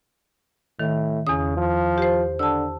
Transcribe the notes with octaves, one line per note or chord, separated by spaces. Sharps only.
A2 D#3
E2 C#3 D#6
F3
G4 C5
D3 A5 E6